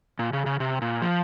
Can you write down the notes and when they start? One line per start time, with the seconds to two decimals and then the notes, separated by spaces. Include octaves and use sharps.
0.19 A#2
0.33 C#3
0.46 C#3
0.60 C3
0.82 A#2
1.02 F3